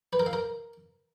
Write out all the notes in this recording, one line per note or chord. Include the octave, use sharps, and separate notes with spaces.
B4
A#4
F5
A#4